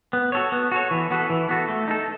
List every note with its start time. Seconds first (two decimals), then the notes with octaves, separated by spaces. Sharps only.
0.13 B3
0.32 F#4 A4 C#5
0.52 B3
0.72 F#4 A4 C#5
0.91 E3
1.11 B3 F#4 A4
1.30 E3
1.49 B3 F#4 A4
1.69 A3
1.88 D#4 A4